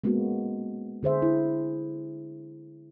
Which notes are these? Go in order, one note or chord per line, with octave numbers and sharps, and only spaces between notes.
G#3 A#3 B3 C#4 F#4
D3 G#4 C5 E5
E4